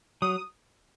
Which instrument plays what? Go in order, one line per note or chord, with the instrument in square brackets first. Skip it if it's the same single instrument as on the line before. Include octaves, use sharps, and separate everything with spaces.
[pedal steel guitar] F#3 [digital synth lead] D#6